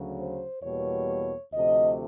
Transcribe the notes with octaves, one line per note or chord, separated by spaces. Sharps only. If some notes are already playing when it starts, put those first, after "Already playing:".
Already playing: D2 C#3 F#3
C5
E2 B2 G3 A#3 C#5
D2 C3 F3 A3 D#5